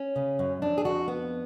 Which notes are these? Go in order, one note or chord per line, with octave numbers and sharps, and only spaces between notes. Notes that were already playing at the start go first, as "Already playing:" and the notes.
Already playing: C#4
C#3
F#2
F2 D4
G#4
F2 F#4
B3